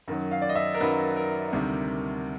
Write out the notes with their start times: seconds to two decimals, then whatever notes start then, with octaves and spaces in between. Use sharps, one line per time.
0.08 F#2 D#3 F#3
0.31 F5
0.42 D5
0.49 D#5
0.56 E5
0.74 A#4
0.80 F#2 D#3 F#3 B4
1.16 A#4
1.52 D2 C3 D#3 G3